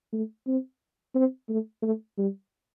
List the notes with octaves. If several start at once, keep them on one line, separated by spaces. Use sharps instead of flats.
A3
C4
C4
A3
A3
G3